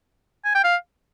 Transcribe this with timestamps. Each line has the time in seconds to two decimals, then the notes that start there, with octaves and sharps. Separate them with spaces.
0.45 G#5
0.55 G5
0.64 F5